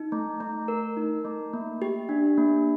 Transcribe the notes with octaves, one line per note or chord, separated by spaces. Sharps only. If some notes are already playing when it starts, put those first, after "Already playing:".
Already playing: D#4
A3
A3
A#4
D#4
A3
A#3
G4
D4
A#3